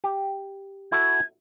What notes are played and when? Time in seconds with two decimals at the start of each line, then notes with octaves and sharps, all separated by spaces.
0.04 G4
0.92 E4 F#4 A4 G#6